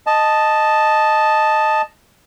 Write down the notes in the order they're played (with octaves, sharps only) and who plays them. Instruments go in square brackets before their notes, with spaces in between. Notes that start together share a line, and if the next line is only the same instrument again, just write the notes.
[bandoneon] D#5 A5